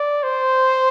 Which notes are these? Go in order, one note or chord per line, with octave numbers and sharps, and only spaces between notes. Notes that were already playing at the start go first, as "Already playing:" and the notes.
Already playing: D5
C5